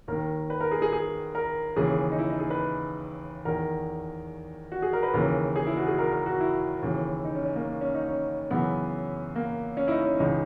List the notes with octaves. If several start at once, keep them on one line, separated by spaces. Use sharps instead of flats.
D#2 D#3 A#4
B4
A#4
G#4
G#4
G#4
A#4
D#2 C#3 E3 G#4
D#4
E4
D#4
G#4
B4
E2 D#3 A#4
F#4
G#4
A#4
B4
D#2 C#3 E3 A#4
G#4
E4
F#4
G#4
A#4
A#4
F#4
E4
D#2 C#3 E3
D#4
C#4
C#4
A#3
C#4
D#4
C#4
F#2 C#3 E3 B3
A#3
C#4
E4
D#4
C#4
C#2 C#3 E3 D#4